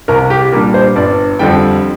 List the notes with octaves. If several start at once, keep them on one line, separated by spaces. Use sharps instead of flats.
C2 A#4
G4
A#2 G3 D4 A#4
C5
G1 D5
F2 D3 G3 G5